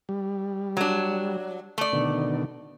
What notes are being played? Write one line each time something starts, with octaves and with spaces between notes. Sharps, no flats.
G3
F#3 D4
A3 D5
B2 D3 D#3